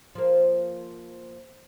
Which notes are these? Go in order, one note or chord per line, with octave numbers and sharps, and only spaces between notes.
F3 A#3